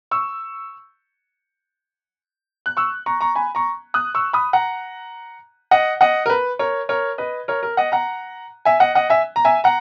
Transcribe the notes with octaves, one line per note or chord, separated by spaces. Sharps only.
C#6 E6
F#6
C#6 E6
A#5 C#6
A#5 C#6
G#5 B5
A#5 C#6
D#6 F#6
C#6 E6
B5 D#6
F#5 A#5
D#5 F#5
D#5 F#5
A#4
B4
A#4 C#5
A#4 C#5
B4 D#5
A#4 C#5
A#4
D#5 F#5
F#5 A#5
E5 G#5
D#5 F#5
D#5 F#5
E5 G#5
A#5
E5 G#5
F#5 A#5